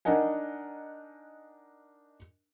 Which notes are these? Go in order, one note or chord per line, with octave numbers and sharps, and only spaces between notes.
D4 D#4 A#4 D#5 F#5 G#5